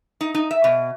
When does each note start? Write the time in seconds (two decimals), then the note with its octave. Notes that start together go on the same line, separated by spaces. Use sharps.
0.21 D#4
0.34 D#4
0.51 E5
0.64 B2